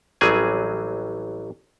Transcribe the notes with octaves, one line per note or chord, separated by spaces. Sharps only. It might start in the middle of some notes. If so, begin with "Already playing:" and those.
A1 F#3 G3 C4 G#4 G#5